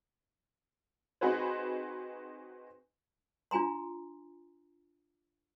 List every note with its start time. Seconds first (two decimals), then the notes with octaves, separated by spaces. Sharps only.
1.21 C4 D#4 F#4 G#4 B4 C5
3.51 D4 F4 G#5 A#5 C6